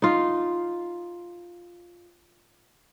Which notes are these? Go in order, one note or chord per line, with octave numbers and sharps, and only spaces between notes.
D#4 F4